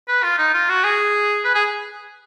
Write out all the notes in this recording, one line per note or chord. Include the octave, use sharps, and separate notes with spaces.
B4
F4
D#4
F4
F#4
G#4
B4
G#4